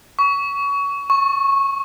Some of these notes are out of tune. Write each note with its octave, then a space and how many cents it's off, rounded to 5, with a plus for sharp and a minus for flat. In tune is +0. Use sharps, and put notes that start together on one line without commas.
C#6 +25
C#6 -15